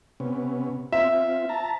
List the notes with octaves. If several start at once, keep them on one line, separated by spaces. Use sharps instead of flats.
C3 B3 C#4
C4 F4 E5
A5 A#5